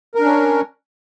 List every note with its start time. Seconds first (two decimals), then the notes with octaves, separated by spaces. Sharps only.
0.15 A#4
0.20 D4
0.24 C#4